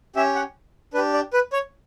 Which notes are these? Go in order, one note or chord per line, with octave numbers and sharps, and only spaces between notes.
C#4 G4 E5
F#5
D4 G4 B4
D5
B4
C#5